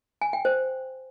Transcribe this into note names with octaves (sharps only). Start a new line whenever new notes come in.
G#5
G5
C5